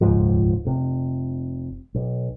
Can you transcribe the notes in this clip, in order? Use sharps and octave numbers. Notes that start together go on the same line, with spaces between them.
D#1 C#2 G#2 F3
F1 C3
B1